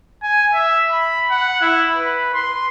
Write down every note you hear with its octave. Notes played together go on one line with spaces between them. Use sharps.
G#5
E5
B5
F#5
E4
B4
C6